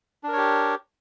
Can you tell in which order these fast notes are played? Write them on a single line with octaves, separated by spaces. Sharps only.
D4 A#4 C#5 G4